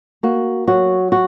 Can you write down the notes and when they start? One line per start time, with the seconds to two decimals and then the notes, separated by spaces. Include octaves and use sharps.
0.23 A#3 F#4
0.67 F#3 F#4
1.12 F#4